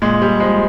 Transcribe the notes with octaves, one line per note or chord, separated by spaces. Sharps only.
A#2 G#3
G3
F3 G#3